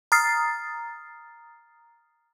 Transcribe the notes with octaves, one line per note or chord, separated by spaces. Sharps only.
A#5 D#6 F6 A6 C7